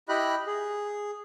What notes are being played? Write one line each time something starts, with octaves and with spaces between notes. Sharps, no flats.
E4 G4 D#5 B5 F#6
G#4